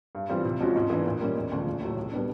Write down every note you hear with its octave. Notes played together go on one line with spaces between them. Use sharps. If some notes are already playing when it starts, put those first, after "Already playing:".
G2
E3 G3 C4 F4
C3
F3 G#3 C#4 F#4
G#2
E3 G#3 B3 D4
A#2
G3 A#3 C#4
E1
D2 C#3 F3
A#1
A2 F#3 A3
C2
B2 G3 B3 D4